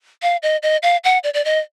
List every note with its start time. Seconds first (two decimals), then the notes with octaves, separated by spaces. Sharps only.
0.22 F5
0.43 D#5
0.63 D#5
0.83 F5
1.04 F#5
1.24 D5
1.34 D5
1.45 D#5